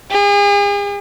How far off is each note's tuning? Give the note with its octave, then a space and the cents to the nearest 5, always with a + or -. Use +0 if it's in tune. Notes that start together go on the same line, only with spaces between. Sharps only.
G#4 -40